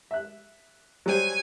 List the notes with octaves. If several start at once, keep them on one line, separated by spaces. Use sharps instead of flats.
E5 F#6
F#3 G3 C5 G#5